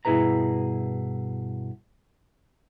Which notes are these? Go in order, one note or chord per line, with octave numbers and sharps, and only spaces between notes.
G2 B2 E4 G#4 B4 A#5